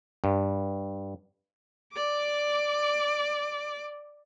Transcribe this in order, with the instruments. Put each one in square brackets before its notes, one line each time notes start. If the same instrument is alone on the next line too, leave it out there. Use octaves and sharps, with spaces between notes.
[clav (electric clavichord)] G2
[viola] D5 D6